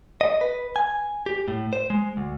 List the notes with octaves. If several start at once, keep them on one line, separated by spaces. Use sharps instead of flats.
D#5
B4
G#5
G4
A2
C5
G#3
D2